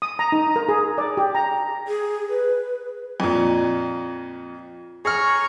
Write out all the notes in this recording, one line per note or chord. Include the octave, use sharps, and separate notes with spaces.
D#6
A#5
D#4
A#4
G#4
D5
G4
A#5
G#4
B4
F2 A#2
G#4 C#5 A#5 C#6 F6